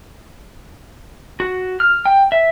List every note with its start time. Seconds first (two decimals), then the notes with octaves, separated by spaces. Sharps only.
1.40 F#4
1.80 F6
2.06 G5
2.32 E5